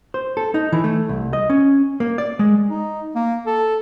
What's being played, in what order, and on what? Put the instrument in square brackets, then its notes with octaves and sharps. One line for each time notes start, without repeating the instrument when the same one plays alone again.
[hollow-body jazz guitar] C5
A4
D#4
E3
A3
C2
D#5
C#4
A#3
D5
G#3
[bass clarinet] D#4
A#3
A4